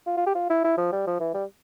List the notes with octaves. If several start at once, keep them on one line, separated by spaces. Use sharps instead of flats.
F4
F4
G4
F4
E4
E4
F3
G3
F3
E3
G3